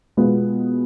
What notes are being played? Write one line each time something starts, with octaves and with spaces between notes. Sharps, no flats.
B2 G#3 B3 F4